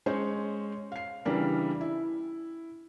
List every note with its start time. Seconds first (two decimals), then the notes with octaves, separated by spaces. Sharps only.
0.06 G#3 C#4 C5 C#5
0.92 F5 C7
1.25 C#3 E3 G3 D4 A#4
1.81 E4